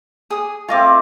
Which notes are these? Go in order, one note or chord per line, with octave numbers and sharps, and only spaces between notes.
G#4 D#6
A3 C4 F4 D#5 D6